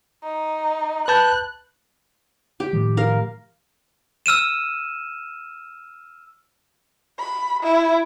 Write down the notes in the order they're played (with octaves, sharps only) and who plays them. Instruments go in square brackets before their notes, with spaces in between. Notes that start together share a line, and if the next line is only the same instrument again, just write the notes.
[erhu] D#4
[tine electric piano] B4 A5 G6 [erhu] F#6
[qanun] G4
[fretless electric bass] A2 D#3 F3
[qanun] A#4 F5
[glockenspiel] E6 F6 D#7 E7
[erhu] B5
E4